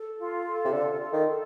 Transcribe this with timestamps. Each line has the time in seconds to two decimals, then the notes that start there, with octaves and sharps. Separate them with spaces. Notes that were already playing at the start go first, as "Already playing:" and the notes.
Already playing: A4
0.18 F4
0.45 A4
0.65 C3
0.72 D3 F4
1.00 A4
1.13 D#3
1.26 A4